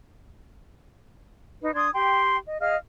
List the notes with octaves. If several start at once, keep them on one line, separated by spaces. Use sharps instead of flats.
D#4 B4
D4 C6 D#6 G#6
G4 G5 C6
D#5
G#4 D#5 F5 F6